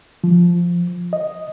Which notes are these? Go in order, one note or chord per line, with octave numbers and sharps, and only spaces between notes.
F3
D#5